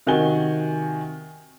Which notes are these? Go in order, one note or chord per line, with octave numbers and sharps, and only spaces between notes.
C3 D#3 F#4 G#5 G7